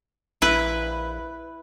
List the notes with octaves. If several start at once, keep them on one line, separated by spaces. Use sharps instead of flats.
A#1 E4 B4